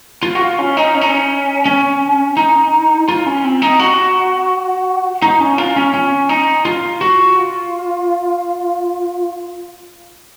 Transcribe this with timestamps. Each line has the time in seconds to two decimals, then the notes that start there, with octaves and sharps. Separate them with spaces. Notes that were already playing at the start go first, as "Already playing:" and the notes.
0.23 F4
0.35 F#4
0.41 F4
0.59 C#4
0.77 D#4
0.95 C#4
1.01 D#4
1.09 C#4
1.66 C#4
2.37 D#4
3.09 F4
3.26 C#4
3.44 C4
3.62 D#4
3.79 F#4
5.22 D#4
5.40 C#4
5.58 F4
5.76 C#4
5.94 C#4
6.29 D#4
6.65 F4
7.01 F#4
7.36 F4